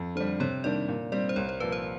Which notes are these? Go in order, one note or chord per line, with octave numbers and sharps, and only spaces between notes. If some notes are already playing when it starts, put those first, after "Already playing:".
Already playing: F2
D3 G3 C5
C3 C#5
D#3 G3 A#3 D4 D5
A#2
G3 C4 D5
C5
C2 C#5
C5
A#2 F3 B4
C5